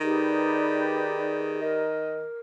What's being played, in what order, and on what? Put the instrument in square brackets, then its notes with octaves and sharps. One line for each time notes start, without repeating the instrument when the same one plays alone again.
[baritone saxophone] D#3 [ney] D#4 [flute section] G4 B4 D5 [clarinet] G#4
[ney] A#4 [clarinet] D#5